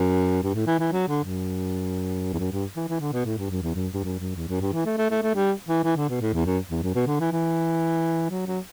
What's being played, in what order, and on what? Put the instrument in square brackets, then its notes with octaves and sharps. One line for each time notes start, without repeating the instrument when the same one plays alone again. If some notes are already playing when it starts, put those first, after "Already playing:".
Already playing: [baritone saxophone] F#2
G2
A2
E3
E3
F#3
D3
F#2
E2
F#2
G2
E3
E3
D3
B2
A2
G2
F#2
E2
F#2
G2
F#2
F#2
E2
F#2
G2
E3
A3
A3
A3
A3
G3
E3
E3
D3
B2
A2
E2
F#2
E2
F#2
B2
D3
E3
E3
F#3
F#3